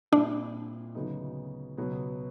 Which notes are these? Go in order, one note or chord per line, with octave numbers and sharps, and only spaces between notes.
A#2 G3 C4 D4 E4
D2 C#3 F#3 B3 D#4
C#2 B2 F#3 B3